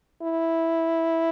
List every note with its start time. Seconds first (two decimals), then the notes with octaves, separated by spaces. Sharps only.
0.22 E4